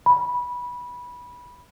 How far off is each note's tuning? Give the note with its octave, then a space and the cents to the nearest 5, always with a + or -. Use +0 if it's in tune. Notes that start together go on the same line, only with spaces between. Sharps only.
B5 -15